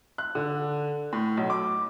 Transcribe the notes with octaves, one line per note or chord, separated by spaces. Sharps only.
F#6
D3
A2
B1
D6